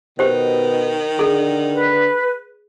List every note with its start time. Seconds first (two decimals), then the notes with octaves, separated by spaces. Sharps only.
0.19 B2 D#3 G4 C5
1.19 D3 G#4 A4
1.74 B4